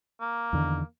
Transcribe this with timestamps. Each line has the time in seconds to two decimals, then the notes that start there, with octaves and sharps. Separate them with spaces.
0.21 A#3
0.53 E2 D3 D#3